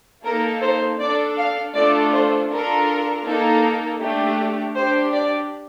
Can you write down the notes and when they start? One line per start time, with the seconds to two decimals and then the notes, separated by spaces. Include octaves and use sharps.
0.25 A#3 D#4 A4 A#4
0.62 C5
1.00 D4 A4 D5
1.38 F5
1.75 A3 D4 F4 A4 D5
2.13 C5
2.50 D4 F4 A4 A#4
3.26 A#3 D#4 A4
4.00 A3 D4 G4
4.76 D4 G4 C5
5.13 D5